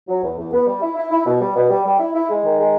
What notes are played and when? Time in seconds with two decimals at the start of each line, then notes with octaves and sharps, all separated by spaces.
0.08 F#3
0.23 E2
0.38 E2
0.53 B3
0.67 G3
0.82 E4
0.96 E4
1.11 E4
1.26 B2
1.41 G3
1.56 B2
1.70 G3
1.85 G3
2.00 E4
2.15 E4
2.29 G#3
2.44 D#3
2.59 G#3